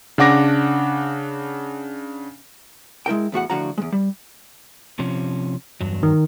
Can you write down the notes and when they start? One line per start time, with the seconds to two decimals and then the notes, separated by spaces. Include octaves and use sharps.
0.18 C#3 D4 F#5 D6 A#6
3.06 G#3 E4 A#4 G5
3.32 E2 A2 F#4 F#5
3.50 A2 D3 F3 F#4 F5 A#5
3.78 E2 G#3
3.92 G3
4.99 C3 F3 C#4
5.81 E2 G2 F#3
6.03 D#3